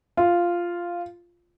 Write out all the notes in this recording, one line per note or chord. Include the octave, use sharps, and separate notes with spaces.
F4